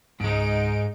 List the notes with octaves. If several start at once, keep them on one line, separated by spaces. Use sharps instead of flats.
C#2 G#2 G#3 D#4 D7